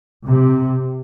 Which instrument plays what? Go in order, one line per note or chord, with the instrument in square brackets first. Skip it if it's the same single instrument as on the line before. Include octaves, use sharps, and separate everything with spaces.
[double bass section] C3